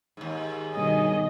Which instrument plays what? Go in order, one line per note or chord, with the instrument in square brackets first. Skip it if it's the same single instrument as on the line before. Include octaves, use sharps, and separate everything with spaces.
[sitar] D#2 G#2
[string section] G2 B2 D#3 [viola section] D#5 [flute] G#5